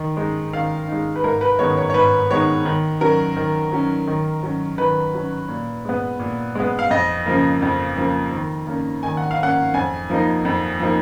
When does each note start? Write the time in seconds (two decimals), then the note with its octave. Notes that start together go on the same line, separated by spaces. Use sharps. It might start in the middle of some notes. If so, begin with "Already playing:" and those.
Already playing: D#3
0.17 G#3 D#4
0.53 D#3 F5
0.88 G#3 D#4
1.16 B4
1.24 G#2 A#4
1.41 B4
1.59 D#3 G#3 B3 D#4 C#5
1.77 C#5
1.90 C#5
1.94 G#2 B4
2.30 D#3 G#3 B3 D#4 C#5
2.65 D#3
3.01 F#3 C#4 A#4
3.36 D#3
3.72 F#3 C#4
4.07 D#3
4.43 F#3 C#4
4.77 D#3 B4
5.14 F#3 C#4
5.49 A#2
5.85 G#3 B3
6.19 A#2
6.55 G#3 B3
6.79 F5
6.90 F2 D#5
7.26 C#3 F3 A#3
7.62 F2
7.97 C#3 F3 A#3
8.32 D#3
8.67 A#3 C#4
9.03 D#3 G#5
9.17 F#5
9.31 F5
9.39 A#3 C#4 F#5
9.74 F2 G#5
10.10 F3 A#3 D#4
10.45 F2
10.80 F3 A#3 D#4